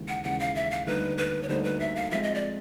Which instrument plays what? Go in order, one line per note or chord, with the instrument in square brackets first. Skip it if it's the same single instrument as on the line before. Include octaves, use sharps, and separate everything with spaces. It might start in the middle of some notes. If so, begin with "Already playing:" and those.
Already playing: [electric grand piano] D#2 C#3 E3 G#3
[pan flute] F#5
[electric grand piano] D#2 C#3 E3 G#3 [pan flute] F#5
[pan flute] F5
E5
F5
[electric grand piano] D2 D3 G3 A#3 D#4 [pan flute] B4
[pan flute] B4
C#5
[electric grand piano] D2 D3 G3 A#3 D#4 [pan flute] C5
[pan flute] B4
E5
F5
[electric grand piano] F3 G#3 C4 [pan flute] E5
[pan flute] D#5
D5